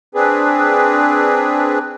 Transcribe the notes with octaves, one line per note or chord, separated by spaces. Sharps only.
C4 D4 G#4 B4